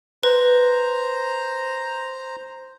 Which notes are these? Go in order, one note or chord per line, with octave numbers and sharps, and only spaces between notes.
B4 C5 A#5